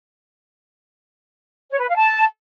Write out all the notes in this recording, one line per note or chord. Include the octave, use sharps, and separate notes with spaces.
C#5
B4
F5
A5